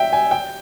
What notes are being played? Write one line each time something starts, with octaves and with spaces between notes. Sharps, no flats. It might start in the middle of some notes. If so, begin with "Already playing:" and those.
Already playing: E5 G5
G#5
G5